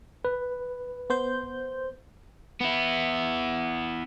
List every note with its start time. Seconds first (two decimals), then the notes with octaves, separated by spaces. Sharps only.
0.25 B4
1.10 B3 C5 G6
2.61 B3 E4